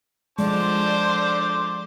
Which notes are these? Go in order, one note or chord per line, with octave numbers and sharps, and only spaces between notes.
D3 F3 G#3 C5 D5 A5 D6